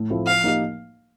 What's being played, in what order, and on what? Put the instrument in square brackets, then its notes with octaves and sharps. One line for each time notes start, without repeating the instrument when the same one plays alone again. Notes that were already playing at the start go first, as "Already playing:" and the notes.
Already playing: [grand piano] A2
F3 A3 C4 E4
[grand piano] F3 [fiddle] F5
[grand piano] A#3 D#4 G4